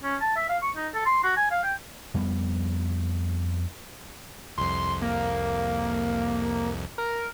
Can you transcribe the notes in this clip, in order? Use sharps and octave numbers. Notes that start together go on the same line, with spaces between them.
C#4
A5
E5
F5
C#6
D#4
A4
C6
F#4
G#5
F5
G5
F2 G3 G#3 B3
C2 F2 C6
A#3
A#4